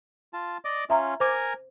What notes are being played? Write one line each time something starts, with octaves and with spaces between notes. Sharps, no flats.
F4 A5
D5 D#5 D6
C#4 F4 E5 A#5
A#4 C5 G#5 A#5 D6 G#6